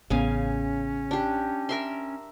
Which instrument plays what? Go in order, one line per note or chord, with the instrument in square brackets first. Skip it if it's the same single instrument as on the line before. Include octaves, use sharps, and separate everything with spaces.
[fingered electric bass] A1 B3 [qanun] C#3 F5 G#5 [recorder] C#4
[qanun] D4 G4
A#4 E5 C6